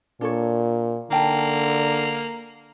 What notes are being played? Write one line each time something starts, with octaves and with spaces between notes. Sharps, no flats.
A#2 D4 A4 C#5
D3 A#3 D#4 G5 A5